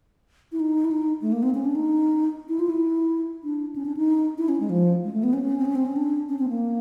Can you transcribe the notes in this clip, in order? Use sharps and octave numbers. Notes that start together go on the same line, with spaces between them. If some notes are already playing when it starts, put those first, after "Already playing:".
E4
D#4
E4
D#4
A3
A#3
C4
C#4
D4
D#4
E4
F4
E4
D4
C#4
D4
D#4
E4
C#4
G#3
F3
G#3
A3
B3
C#4
C4
C#4
C4
C#4
D4
C#4
C4
A#3